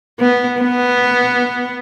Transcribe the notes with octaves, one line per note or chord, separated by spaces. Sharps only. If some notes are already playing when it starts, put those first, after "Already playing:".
B3
B3